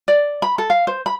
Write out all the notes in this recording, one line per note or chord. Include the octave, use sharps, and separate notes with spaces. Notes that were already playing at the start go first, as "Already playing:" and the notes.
D5
B5
A4
F5
C5
B5